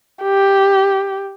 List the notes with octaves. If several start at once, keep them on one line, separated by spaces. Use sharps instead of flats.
G4